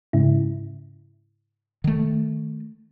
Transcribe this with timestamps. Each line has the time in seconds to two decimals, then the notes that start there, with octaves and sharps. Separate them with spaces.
0.13 G#2 C#3 E4
1.84 D#3 A3